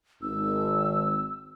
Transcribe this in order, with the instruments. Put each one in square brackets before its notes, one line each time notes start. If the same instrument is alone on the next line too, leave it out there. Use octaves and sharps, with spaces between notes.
[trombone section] G#1 [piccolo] E6